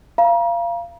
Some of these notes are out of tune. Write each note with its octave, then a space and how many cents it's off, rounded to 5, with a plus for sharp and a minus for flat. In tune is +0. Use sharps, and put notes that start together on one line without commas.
F5 -25 A#5 +35